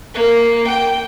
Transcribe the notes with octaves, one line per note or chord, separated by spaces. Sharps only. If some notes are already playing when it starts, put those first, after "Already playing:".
A#3
G5